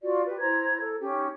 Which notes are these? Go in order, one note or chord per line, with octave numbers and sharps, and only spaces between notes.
F4 F#4 D5
G4 B4
E4 C5 A#5 G#6
A4
C#4 D#4 G4